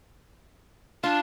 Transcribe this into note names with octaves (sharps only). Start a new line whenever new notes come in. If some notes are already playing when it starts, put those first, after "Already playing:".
D4 F4